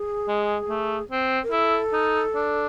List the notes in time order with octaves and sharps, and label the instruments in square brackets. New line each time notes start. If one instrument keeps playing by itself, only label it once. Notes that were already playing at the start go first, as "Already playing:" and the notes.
Already playing: [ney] G#4
[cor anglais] G#3
A3
C4
[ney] A#4
[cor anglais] E4 [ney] A4
[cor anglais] D#4
D4